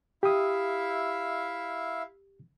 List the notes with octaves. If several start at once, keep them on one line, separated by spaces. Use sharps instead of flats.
E4 G4 E5 F5 D#6